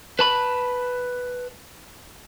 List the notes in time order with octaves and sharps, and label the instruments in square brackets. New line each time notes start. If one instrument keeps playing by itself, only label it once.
[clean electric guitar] B4 A5 B5